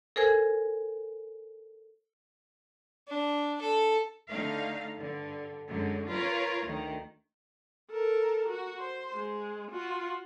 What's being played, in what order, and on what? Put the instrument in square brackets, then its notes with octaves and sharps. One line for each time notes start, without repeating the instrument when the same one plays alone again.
[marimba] A4 A#4 C5 G#5 G#6
[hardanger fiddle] D4
A4
[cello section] D3 A3 D#4 F5
G2 D3
F#2 D3 F#3 G#3
F4 A#4 B4 C#5
D2 D#3
[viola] A4 A#4
F#4
C5
G#3
F4 F#4